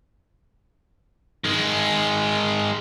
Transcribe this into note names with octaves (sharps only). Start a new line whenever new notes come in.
D#3 G#3